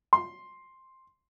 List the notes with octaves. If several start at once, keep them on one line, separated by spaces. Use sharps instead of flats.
C6